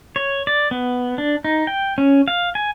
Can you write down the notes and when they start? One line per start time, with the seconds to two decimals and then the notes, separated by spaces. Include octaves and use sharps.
0.16 C#5
0.47 D5
0.71 B3
1.18 D4
1.44 D#4
1.67 G5
1.98 C#4
2.28 F5
2.55 G#5